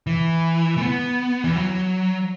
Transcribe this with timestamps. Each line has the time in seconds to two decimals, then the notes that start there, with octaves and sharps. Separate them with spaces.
0.07 E3
0.77 A3
0.81 B3
1.44 E3
1.55 F#3